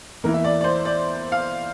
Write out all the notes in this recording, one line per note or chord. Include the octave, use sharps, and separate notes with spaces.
E2 E3 A#3 E4 A#4
E5
D5
D5
C5
D5
F5